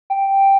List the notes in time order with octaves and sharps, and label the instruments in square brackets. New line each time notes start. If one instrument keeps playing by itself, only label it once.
[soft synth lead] G5